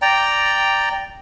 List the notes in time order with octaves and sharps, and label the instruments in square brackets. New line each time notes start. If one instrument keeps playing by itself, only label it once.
[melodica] D5 G5 A#5